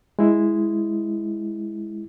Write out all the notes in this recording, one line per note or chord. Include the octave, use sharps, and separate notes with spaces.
G#3 E4